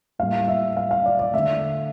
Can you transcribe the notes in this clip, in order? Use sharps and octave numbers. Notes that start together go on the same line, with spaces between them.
A2 G3 A#3 F5
E5
F5
F5
D5
D5
D3 A3 E5